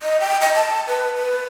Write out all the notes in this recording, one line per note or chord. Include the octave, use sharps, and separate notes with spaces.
D#5
G5
D#5
A5
B4
B4